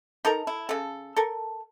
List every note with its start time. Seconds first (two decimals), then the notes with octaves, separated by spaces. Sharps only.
0.25 D#4 A4 A#4 A#5
0.47 E4
0.69 C#3 A4
1.17 A4 A#4